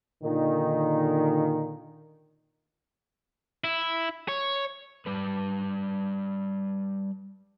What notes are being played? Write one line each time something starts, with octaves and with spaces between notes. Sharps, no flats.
A#2 D3 D#3
E4
C#5
G3 B4